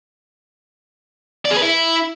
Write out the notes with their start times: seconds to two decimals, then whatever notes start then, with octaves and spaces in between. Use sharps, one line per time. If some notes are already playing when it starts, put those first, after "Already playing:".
1.45 D5
1.51 G#4
1.57 B4
1.62 E4